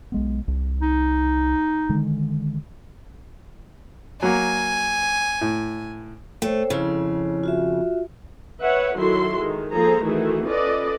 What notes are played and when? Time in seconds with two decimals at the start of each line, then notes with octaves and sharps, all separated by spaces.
0.12 B1 G#3 B3
0.48 C2
0.82 D#4
1.89 D3 D#3 G#3
4.22 F#3 A#3 G#5
5.41 A2
6.42 A3 C5 C#5 G5
6.70 F2 C#3 E4 C#5
7.44 F4 F#4 E5
8.62 B4 C#5 E5 F#5
8.94 D#3 F#3 E4 F#4 A4 C6
9.40 D#3 G#3
9.73 F3 A#3 G#4 A4 C5 A#5
10.03 D#3 E3 A3 E4 F#4 G#4
10.47 C#4 F4 A4 B4 D5 D#5